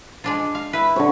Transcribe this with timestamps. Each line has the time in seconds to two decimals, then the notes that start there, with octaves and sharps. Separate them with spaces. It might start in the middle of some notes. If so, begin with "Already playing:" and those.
0.24 G#3 D4 F4
0.55 F5
0.73 E4 B4
0.96 D3 C#5